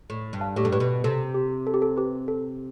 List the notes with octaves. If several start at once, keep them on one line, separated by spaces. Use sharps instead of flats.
A2
G2
F5 A5
A2 G4
G2 A4
A2 G4 B4
B2
C3 A4
G4
A4
G4
A4
G4 B4
A4